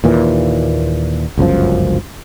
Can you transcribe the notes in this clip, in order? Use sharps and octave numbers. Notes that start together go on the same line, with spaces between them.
D#2 A#2 E3
G1 C#2 F#2 F3